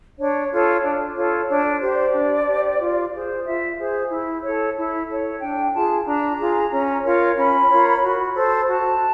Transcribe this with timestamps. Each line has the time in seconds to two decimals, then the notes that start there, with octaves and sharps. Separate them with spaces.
0.17 D4 C#5
0.51 F4 A4 C#5
0.83 D4
1.15 F4 A4 C#5
1.48 D4 C#5
1.70 D5
1.81 G4 C5
1.92 D5
2.14 D4
2.46 G4 C5
2.79 F4
3.12 G#4 C5
3.45 F4 E5
3.77 G#4 C5
4.09 E4
4.42 A4 C#5
4.76 E4
5.09 A4 C#5
5.40 D4 G5
5.73 F4 G#4 A5
6.05 D4 A#5
6.38 F4 G#4
6.71 C#4
7.04 F4 A#4 C#5
7.36 C#4 B5
7.69 F4 A#4 C#5
8.02 F#4
8.35 A4 C5
8.67 F#4 A5